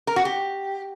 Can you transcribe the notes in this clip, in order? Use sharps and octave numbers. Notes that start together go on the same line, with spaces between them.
A#4
F#4
G4